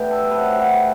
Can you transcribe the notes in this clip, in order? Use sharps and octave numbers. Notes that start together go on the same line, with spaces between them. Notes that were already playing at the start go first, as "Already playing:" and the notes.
Already playing: A2 E3 B3 D4 G4
A4
C3 F#3 A3 B4
F#4 G4